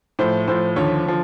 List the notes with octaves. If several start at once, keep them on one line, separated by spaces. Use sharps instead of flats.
A2 F3 C5
A2 F3 C5
D#2 D3 F3 C#5
D3 F3